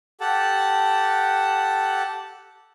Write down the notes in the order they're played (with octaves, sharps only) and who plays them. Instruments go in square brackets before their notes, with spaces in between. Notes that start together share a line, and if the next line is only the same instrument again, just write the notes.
[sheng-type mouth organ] G4 A4 F#5 A5